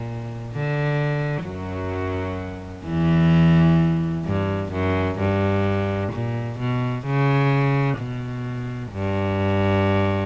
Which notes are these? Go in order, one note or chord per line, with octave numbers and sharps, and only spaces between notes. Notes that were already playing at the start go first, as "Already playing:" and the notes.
Already playing: A#2
D3
F#2 F#3
E2 E3
G2
F#2
G2
A#2
B2
C#3
B2
G2